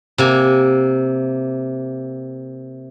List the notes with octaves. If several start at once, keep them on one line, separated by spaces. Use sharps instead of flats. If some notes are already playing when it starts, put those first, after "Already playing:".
C3 A#3 G#5